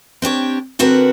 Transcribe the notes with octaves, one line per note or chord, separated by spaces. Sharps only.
C4 D4 G4 C#5
D3 C4 F#4 A#4 B4 F#5